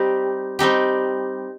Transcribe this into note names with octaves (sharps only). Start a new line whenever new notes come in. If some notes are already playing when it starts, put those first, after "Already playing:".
Already playing: G3 C4 D#4 G4
G3 C4 D#4 G4